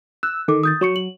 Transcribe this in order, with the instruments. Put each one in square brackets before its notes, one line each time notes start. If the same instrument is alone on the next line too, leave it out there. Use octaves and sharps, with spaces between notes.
[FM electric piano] E6 [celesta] F#6
[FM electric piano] D#3 [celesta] A4 D6
[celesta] D#6 G6 A6
[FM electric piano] F#3 [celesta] C#5 C#6 C#7
[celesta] F#7